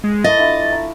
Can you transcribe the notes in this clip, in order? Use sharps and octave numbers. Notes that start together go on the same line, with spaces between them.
G#3
A3 E4 D#5 A6
D4 E4 F4
A#5